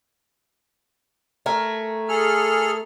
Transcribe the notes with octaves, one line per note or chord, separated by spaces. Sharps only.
A3 A#4 G#5
G#4 A4 F6